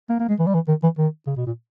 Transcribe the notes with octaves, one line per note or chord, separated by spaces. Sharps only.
A#3
A#3
G#3
E3
G3
E3
D#3
E3
D#3
C#3
B2
A#2